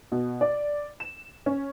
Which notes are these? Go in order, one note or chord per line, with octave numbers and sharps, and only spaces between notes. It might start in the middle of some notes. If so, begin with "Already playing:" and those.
B2
D5
E7
C#4